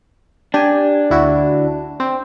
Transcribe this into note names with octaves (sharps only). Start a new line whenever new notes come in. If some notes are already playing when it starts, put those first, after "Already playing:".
D4 G4 G#5
D2 E4 F#4
C4